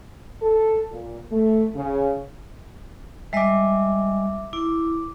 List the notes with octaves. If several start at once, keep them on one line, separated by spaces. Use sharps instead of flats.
A4
A#2
A3
C#3
G3 G#3 D#5 E5 D6
E4 D6